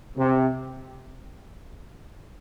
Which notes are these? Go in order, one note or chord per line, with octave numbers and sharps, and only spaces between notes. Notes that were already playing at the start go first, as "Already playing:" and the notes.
C3